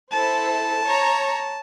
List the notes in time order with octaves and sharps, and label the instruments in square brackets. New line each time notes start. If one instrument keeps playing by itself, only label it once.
[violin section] E4 A4 C5 [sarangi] A5
[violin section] C#5 A#5